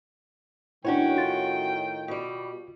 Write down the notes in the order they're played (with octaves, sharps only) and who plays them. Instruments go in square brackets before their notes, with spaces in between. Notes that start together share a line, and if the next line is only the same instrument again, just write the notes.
[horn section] A2 D#3 G5 [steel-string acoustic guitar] C#4 F#4 C#5 [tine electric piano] D4 E4
[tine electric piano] F4 A6
[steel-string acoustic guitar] B2 G3